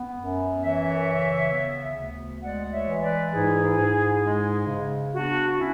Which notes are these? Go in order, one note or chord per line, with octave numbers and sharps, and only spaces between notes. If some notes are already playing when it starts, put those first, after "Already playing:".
Already playing: B3
F#2
E3 C#5 E5
C#3
B3
D2
G#3 D5 F#5
C#5 E5
E3
B4 D5
G#2 E4 G#4
G#2
G#3
C#3
B3 D4 F#4
C#4 E4